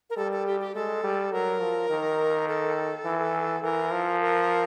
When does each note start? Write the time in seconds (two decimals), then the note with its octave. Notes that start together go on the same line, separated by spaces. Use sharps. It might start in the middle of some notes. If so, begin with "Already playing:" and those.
0.10 A#4
0.17 G3 A4
0.32 A4
0.46 G4
0.60 G4
0.75 G#3 A4
1.04 G3
1.33 F#3 A#4
1.62 F3
1.90 D#3
2.48 A4
3.05 E3
3.63 E3 A#4
3.92 F3
4.21 A#4